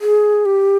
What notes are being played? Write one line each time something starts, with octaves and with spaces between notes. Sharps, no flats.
G#4
G4